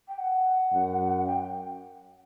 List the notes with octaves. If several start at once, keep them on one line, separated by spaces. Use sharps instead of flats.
G5
F#5
F#2
G5